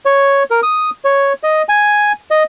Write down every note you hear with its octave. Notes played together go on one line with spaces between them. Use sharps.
C#5
A#4
D#6
C#5
D#5
G#5
D#5